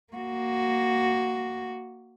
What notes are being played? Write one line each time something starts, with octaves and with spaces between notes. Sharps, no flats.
A#3 F#4